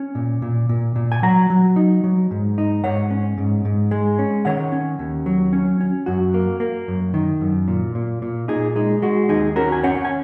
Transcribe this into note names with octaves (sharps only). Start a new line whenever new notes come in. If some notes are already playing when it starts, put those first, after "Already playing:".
Already playing: C#4
A#2
A#2
A#2
A#2
G#5
F#3 F#5 A#5
F#3
D#4
F#3
G#2
D#4
G#2 C#5 F#5
C#4
G#2
G#2
G#3
C#4
D#3 C#5 F#5
C#4
D#2
F#3
C#4
C#4
F#2 F#4
A#3
A#3
F#2
D#3
F#2
A#2
A#2
A#2
A#2 D#4 G#4
G#3 D#4
G#3 F#4
D#2 D#4 G#4
C#4 F#4 A#4
G#5
C#4 C#5 F#5
G#5